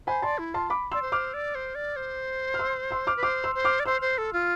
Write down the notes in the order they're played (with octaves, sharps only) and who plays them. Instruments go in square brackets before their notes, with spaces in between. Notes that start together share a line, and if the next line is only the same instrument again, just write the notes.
[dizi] C5 [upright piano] G#5 B5
[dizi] D5 [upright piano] A5 C6
[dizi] E4
[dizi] F4 [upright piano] A5 C6
[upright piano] B5 D6
[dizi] D5 [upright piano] C6 E6
[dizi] C5
[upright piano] D6 F6
[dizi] D5
C5
D5
C5
[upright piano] F6
C6 E6
C6 E6
D6 F6
[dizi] B4
[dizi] C5 [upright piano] D6 F6
[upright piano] C6 E6
[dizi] C5
[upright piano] D6 F6
[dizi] D5
[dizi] C5 [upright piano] C6 E6
[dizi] C5
A4
F4